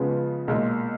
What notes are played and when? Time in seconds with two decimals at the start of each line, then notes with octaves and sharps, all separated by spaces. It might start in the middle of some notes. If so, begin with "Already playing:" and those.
Already playing: C#3 F3 G#3 B3
0.48 B1 A#2 G#3